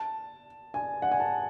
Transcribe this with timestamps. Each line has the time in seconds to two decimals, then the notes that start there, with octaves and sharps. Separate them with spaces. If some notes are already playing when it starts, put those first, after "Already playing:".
Already playing: A5
0.74 G#5
1.02 F#5
1.11 G#5
1.20 A5